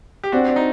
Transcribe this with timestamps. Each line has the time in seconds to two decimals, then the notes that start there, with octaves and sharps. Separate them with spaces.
0.23 G4
0.32 C4 D4 F#4
0.48 D4
0.56 D#4